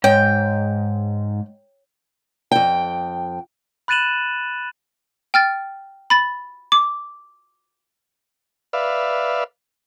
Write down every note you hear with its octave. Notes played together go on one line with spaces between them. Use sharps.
G#2 C#5 G5
F2 G5
B5 F#6 A6 D#7 E7 F#7
G5 F6 A6
B5 A6
D6
B4 D5 E5 F5